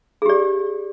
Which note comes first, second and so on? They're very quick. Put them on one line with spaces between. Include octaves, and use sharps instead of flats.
G#4 G4 D5